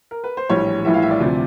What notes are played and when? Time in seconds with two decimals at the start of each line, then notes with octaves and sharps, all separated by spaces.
0.11 A#4
0.24 B4
0.37 C5
0.50 A#1 A2 E3 G3 C#5
0.85 A#1 A2 E3 G3 E5
0.94 F5
1.02 E5
1.11 D5
1.20 D2 C3 F3